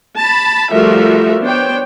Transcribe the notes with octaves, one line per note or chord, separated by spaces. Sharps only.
A5 B5
F3 G3 A3 F#4 A#4 E5
B3 D4 C5 C#5 G5